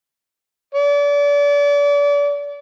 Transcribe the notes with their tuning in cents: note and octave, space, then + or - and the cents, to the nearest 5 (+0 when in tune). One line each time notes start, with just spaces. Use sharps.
D5 -35